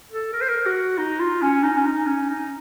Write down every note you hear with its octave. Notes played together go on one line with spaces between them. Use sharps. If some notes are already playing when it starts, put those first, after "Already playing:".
A4
A#4
C5
A#4
F#4
D#4
F4
C#4
D#4
C#4
D#4
C#4
D#4